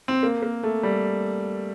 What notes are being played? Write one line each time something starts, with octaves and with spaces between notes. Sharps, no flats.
C4
A#3
A#3
A3
G3